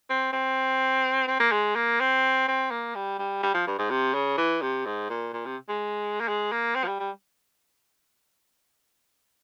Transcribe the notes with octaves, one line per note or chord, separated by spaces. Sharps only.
C4
C4
C4
A#3
G#3
A#3
C4
C4
A#3
G3
G3
G3
F3
G2
G#2
C3
C#3
E3
C3
G#2
A#2
A#2
C3
G#3
A#3
G#3
A#3
C4
F3
G3
G3